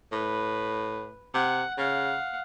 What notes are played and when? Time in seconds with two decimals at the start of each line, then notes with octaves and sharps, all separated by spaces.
0.12 A2 B4
1.34 C3 F#5
1.78 C#3 F5 F#5